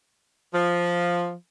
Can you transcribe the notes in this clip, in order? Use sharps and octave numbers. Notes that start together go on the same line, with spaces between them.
F3